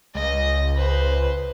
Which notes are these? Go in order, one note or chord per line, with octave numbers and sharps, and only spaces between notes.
C#2 D#5
B4 C5